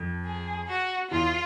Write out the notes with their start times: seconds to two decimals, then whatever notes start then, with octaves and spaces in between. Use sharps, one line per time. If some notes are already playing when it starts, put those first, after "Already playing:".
Already playing: F2 F3
0.26 G#4
0.69 F#4
1.11 E2 E3 F4